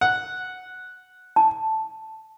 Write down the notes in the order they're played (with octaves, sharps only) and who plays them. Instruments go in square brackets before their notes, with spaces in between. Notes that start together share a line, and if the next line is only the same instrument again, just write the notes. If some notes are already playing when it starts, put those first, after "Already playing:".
[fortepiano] F#5
[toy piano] A5